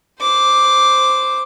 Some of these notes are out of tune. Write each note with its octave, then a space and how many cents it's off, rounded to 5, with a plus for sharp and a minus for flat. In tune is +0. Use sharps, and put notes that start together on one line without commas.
C5 +0 D6 +0